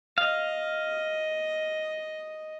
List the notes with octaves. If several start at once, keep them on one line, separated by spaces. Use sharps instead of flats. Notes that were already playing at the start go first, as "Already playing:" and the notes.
D#5 F5